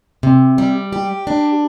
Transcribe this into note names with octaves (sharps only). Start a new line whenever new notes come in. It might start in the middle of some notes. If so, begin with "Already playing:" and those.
C3
G3
G4
D4